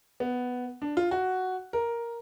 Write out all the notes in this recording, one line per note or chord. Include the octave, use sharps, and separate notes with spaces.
B3
D4
F4
F#4
A#4